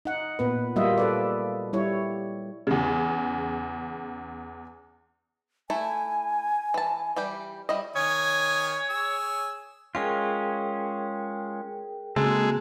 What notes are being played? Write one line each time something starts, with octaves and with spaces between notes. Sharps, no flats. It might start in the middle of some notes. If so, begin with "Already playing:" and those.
D#4 F#5
A#2 B3 B4
F#3 G3 A#3 F4 D#5 E5
A4 B4 D5
G3 E4 C#5
E2 C#3
A3 E4 A4 G#5
E3 A5
E3 G3 G4
G3 E4 D#5
D#3 C#5 G#5 D#6
G#4 E6
G#3 C#4 F4 G#4 A#4 G5
C#3 G#3 A#3 C4 F#4 A4